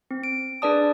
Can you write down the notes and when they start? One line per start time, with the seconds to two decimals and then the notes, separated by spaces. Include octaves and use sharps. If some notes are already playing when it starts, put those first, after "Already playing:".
0.11 C4
0.23 D7
0.62 D4 G#4 B4 D5 A5 D#6